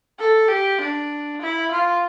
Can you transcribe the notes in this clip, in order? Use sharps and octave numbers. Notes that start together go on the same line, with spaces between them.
A4
G4
D4
E4
F4